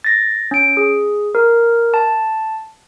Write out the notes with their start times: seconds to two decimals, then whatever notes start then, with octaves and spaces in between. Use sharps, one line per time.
0.04 A6 A#6
0.51 C#4 D7
0.77 G#4
1.35 A#4
1.94 A5